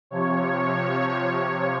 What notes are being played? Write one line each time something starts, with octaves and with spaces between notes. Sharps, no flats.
C3 F3 C#5